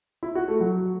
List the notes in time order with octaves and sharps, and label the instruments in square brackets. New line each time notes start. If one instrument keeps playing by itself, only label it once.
[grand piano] E4
F#4
A3
F#3